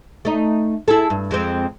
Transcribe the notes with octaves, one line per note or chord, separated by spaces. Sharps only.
A3 D#4
E4 G#4 A4
G2
F2 G#3 C4